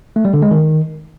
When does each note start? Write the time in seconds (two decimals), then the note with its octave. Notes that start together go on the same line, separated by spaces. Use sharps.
0.16 A3
0.25 G3
0.34 D3
0.42 G#3
0.51 D#3